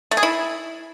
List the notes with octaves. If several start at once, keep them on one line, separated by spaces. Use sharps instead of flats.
A3
G#4
E4